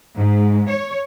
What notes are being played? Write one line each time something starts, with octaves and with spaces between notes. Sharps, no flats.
G#2
C#5